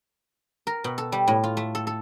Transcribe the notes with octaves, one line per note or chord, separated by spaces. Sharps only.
A#4
B2
A4
G3
A2
F4
A3
A4
A4